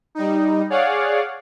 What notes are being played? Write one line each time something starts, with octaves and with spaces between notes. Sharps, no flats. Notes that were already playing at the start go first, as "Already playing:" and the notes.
G3 D#4
G#4 C#5 D5 F5 F#5